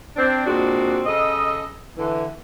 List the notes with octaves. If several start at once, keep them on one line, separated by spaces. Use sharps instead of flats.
C4 D4
A#2 G#3 C4 D4 F#4
C#3 A4 D#5
D3 E3